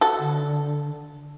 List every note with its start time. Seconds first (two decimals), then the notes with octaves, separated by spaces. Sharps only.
0.01 F#4 A4
0.19 D3